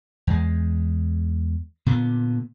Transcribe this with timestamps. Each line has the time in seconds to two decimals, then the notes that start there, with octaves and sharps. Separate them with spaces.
0.27 E2 G#3
1.86 A#2 D3 B3